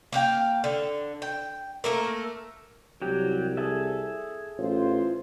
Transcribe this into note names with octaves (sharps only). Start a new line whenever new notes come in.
A#3 F5 G5
D3
G5
A3 A#3 A#4
C2 F#3 G4 G5
G#4 A4 E5
A1 F4 C5